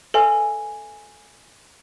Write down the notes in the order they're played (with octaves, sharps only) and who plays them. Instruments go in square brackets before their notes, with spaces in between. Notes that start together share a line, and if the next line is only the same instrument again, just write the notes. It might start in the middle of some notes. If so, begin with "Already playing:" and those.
[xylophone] A4 [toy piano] B4 E5 G#5